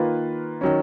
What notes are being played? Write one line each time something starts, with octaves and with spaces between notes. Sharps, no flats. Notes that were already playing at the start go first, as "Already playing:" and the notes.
Already playing: D#3 A#3 F4 B4
D#3 F#3 C#4